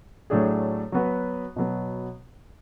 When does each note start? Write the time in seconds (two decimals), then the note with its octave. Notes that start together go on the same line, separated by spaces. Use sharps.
0.30 A2 F#3 A3 D4 G#4
0.92 F#3 B3 F#4 B4
1.56 B2 F#3 B3